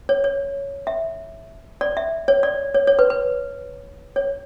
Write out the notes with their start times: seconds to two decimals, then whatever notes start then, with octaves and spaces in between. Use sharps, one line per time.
0.09 C#5
0.24 C#5
0.87 E5
1.81 D5
1.97 E5
2.28 C#5
2.43 D5
2.75 C#5
2.87 C#5
2.99 B4
3.10 B4
4.16 C#5